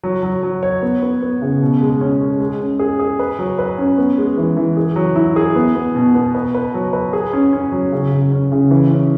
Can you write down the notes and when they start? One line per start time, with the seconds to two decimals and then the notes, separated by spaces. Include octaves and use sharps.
0.03 F#3
0.23 F#3
0.43 F#3
0.63 C#5
0.82 B3
1.02 B3
1.22 B3
1.42 C#3
1.62 B2
1.81 G#3
2.01 C#4
2.21 G#3
2.40 G#3
2.60 C#4
2.79 G#4
2.99 G#4
3.19 B4
3.39 F#3
3.59 B4
3.78 C#4
3.98 B3
4.18 G#3
4.38 E3
4.57 E3
4.77 G#4
4.96 F#3
5.16 E4
5.36 G#4
5.56 B3
5.75 B3
5.95 B2
6.15 B3
6.35 B4
6.54 B4
6.74 F#3
6.93 B4
7.13 G#4
7.33 C#4
7.53 C#4
7.72 F#3
7.92 C#3
8.12 C#3
8.32 C#4
8.52 C#3
8.71 E3
8.91 C#4